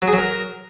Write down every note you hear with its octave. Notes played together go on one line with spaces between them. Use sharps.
F#3
G#4
F#3
A#4